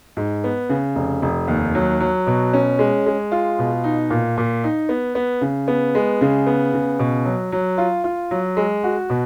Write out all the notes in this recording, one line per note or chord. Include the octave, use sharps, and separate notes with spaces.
G#2
B3
C#3
F1
F1
D#2
F#3
F#3
B2
C#4
G#3
G#3
F4
B2
D#4
A#2
A#2
D#4
B3
B3
C#3
B3
G#3
C#3
B3
C#3
B2
F#3
F#3
F4
F4
F#3
G#3
F#4
B2